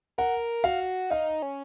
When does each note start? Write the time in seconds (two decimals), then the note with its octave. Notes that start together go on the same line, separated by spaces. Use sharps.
0.18 A#4 F#5
0.64 F#4 F5
1.10 D#4 F5
1.42 C#4